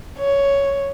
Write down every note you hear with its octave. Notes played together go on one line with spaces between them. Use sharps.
C#5